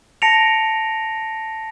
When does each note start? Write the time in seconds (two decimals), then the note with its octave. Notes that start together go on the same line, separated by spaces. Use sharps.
0.22 A5 A#6 C#7 D7 F7